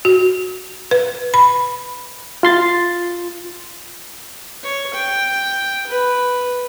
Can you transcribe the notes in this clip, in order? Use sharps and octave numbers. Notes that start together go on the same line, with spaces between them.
F#4
B4
B5
F4 C6 A6
C#5
G5
B4